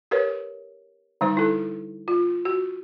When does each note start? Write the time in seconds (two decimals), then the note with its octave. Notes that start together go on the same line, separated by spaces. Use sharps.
0.11 G4 A#4 B4 C#5
1.21 D3 G3 D#4 C5
1.37 E4 A4
2.08 F4
2.45 F#4